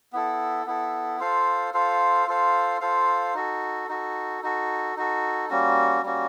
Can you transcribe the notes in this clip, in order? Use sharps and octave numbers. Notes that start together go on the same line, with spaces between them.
B3 E4 A4
B3 E4 A4
F4 A4 C5 F5
F4 A4 C5 F5
F4 A4 C5 F5
F4 A4 C5 F5
D#4 F#4 A4
D#4 F#4 A4
D#4 F#4 A4
D#4 F#4 A4
G3 A#3 C#4 F#4
G3 A#3 C#4 F#4